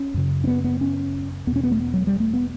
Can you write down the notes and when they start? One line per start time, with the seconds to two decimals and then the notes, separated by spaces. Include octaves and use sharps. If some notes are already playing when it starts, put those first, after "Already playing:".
Already playing: C#4
0.14 F#2 C#3
0.44 C#4
0.47 B3
0.64 B3
0.81 C#4
1.47 E2 B3
1.51 B2 C#4
1.63 B3
1.71 A3
1.80 B3
1.94 F#3
2.07 G3
2.20 A3
2.34 B3